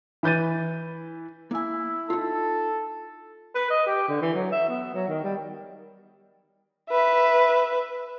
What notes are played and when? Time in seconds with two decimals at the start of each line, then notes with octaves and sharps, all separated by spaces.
0.23 E3 B4 G6 A6 D#7
1.51 A#3 E4 G#5
2.10 D#4 F4 A4
3.55 B4
3.70 D#5
3.86 G4
4.08 D3
4.22 E3
4.35 F#3
4.52 E5
4.69 B3
4.94 F#3
5.09 D#3
5.24 G3
6.90 B4 E5